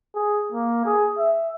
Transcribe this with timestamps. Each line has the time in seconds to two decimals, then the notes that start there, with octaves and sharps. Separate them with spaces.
0.15 G#4
0.52 A#3
0.86 G#4
1.18 E5